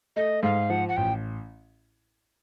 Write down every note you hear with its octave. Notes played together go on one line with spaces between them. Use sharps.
A3 D#5
G#2 F5
F3 F#5
F#5
A1 G5